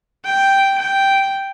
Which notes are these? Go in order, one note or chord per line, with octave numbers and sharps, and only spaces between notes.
G5
G5